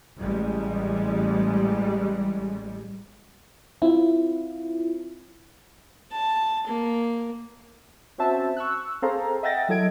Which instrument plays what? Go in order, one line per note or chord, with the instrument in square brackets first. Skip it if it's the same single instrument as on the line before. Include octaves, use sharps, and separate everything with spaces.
[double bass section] A1 G3 G#3
[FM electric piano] C4 E4 F4
[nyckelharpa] A5
A#3
[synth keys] C4 C#4 F#4 C5 E5 A5
C#6 E6 F#6
C4 G#4 A4 C5 F5 A#5
D#5 E5 F#5 G5 A6 A#6
F#3 E4 A4 D#5 G#6 D7